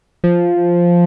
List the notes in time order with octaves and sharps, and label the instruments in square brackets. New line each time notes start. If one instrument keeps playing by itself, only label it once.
[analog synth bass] F3